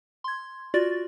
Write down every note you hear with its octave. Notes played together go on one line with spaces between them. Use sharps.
C6 G#6
F4 F#4 D5 A6